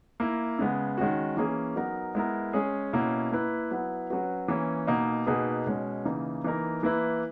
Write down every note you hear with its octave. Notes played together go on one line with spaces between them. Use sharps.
A#3 E4 A#4
C#3 G#3 B3
D#3 G#3 C#4 F#4
E3 A#3 C#4 G#4
F#3 B3 D#4 A#4
G#3 B3 E4 A#4
G#3 C#4 G#4
B2 A#3 C#4 E4
A#3 E4 B4
F#3 B3 E4 B4
F#3 C#4 F#4 B4
E3 A#3 C#4
B2 A#3 D#4
B2 A#3 D#4 G#4 B4
B2 G#3 C#4
C#3 E3 A#3 D#4
E3 A#3 D#4 A#4
E3 A#3 E4 B4